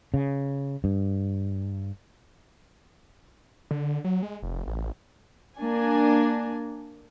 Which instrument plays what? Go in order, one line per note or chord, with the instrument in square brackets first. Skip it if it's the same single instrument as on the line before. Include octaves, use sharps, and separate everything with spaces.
[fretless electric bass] C#3
G2
[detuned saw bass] D3
F#3
G#3
F1
A1
[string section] A#3 D4 G#5